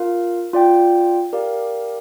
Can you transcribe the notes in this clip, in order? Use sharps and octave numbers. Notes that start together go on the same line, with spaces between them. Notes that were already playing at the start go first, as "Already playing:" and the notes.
Already playing: F4 A#4 F5
F4 D5 G5
G4 A#4 D5 F5